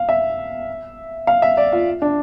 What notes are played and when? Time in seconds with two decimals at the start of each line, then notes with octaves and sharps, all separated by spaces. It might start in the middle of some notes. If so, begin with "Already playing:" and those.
Already playing: F5
0.09 E5
1.27 F5
1.42 E5
1.57 D5
1.72 F4
2.02 D4